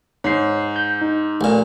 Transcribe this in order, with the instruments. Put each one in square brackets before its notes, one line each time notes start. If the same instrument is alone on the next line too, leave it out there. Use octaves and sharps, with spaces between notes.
[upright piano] G#2 [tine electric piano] C#5 C7
[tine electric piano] G6
D#4
[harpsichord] A1 A#2